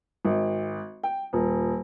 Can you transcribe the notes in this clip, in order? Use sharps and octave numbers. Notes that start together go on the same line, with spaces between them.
G#1
G5
D#1